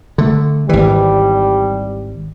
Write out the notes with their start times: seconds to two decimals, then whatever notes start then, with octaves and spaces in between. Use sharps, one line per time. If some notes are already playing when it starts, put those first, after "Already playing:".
0.18 D3 A3
0.69 G#1 E3 G3